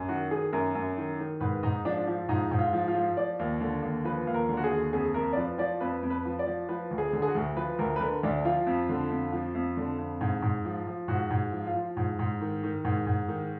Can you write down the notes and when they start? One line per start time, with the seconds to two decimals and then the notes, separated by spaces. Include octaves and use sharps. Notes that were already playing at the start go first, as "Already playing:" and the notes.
Already playing: F#2
0.08 D#3 F#4
0.31 D#3 G#4
0.53 F#2 A#4
0.75 F#2
0.97 D#3
1.19 D#3
1.41 G#2 B4
1.63 G#2 D#4
1.85 F3 D4
2.07 F3
2.29 G#2 D#4
2.51 G#2
2.59 F4
2.73 F3
2.88 F4
2.95 F3
3.17 F3 D5
3.39 D#2
3.61 D3
3.82 D#2
4.04 F3 B4
4.27 D#2
4.34 A#4
4.49 D3
4.57 F#4
4.64 G#4
4.71 D#2
4.93 F2 G#4
5.14 F2 A#4
5.33 D5
5.37 F3 B4
5.58 F3 D5
5.81 F2 B4
6.03 F2
6.10 B4
6.25 F3
6.39 D5
6.47 F3
6.69 F3 B4
6.91 D2
6.98 G#4
7.13 D3
7.22 G#4
7.28 F#4
7.35 D2
7.56 F3 B4
7.79 D2 A#4
7.96 B4
8.00 D3 A#4
8.23 D2 D4
8.45 F3 F4
8.67 F2
8.89 D3
9.10 F2
9.32 F3
9.55 F2
9.77 D3
9.98 F2
10.21 G#2
10.42 G#2
10.65 F3
10.87 F3
11.08 G#2 F#4
11.31 G#2
11.52 F3
11.67 F4
11.75 F3
11.97 G#2
12.19 G#2
12.41 D#3
12.63 D#3
12.85 G#2
13.07 G#2
13.28 D#3